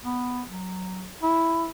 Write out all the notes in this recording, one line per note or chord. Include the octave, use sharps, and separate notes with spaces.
B3
F#3
E4